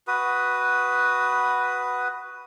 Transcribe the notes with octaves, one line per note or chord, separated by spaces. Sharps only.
F#4 B4 D#6